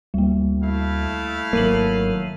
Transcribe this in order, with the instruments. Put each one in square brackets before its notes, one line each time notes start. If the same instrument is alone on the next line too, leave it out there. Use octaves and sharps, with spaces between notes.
[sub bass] D2 [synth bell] G3 A#3
[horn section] A3 E4 F5
[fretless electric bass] G#1 A#3 [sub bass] F#3 [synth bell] C7 D#7 F#7